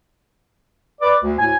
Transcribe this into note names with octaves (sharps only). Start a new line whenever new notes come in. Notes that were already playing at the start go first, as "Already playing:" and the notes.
B4 D5
D2
D2 A2 G#5